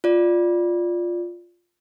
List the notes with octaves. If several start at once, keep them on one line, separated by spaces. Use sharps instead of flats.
F4 D5